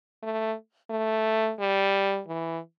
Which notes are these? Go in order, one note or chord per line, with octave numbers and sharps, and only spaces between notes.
A3
A3
G3
E3